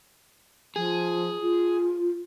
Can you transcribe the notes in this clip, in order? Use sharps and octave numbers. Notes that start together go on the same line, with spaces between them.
F3 G#4
F4